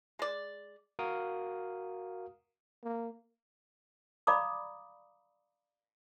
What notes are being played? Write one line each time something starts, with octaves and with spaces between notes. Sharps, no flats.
G#3 D5
F#4 A#4 F5 D#6
A#3
D5 F5 A#5 B5 D6 D#6